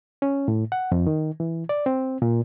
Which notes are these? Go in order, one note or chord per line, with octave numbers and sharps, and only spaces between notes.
C#4
A2
F#5
F2
D#3
E3
D5
C4
A#2